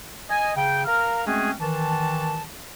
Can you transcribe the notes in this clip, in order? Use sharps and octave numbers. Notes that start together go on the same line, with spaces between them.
D#5 G#5
C#3 G5
A#4 F5 A#5 F6
G#3 A3 C4 C#4 F#4 G#4
D#3 E3 A5